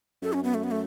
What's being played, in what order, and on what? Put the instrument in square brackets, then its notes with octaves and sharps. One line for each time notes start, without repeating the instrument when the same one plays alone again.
[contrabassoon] F#2 [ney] A4
[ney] C#4
B3
A3
B3
A3